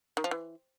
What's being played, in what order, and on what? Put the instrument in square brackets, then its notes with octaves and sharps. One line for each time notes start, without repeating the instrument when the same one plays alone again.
[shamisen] D#3
F3
E3